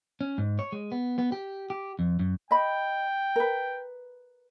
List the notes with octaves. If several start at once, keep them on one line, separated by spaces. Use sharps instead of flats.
C#4
G#2
C#5
G#3
B3
B3
G4
G4
F2
F#2
D#5 G5 B5
A#4 B4